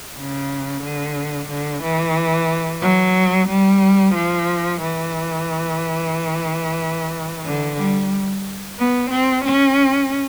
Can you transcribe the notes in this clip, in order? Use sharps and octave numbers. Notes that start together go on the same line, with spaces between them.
C#3
D3
D3
E3
F#3
G3
F3
E3
D3
G3
B3
C4
C#4